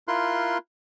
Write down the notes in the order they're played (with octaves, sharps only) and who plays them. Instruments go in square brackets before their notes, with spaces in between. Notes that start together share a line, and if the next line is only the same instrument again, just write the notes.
[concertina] E4 F4 A#4 C6 F#6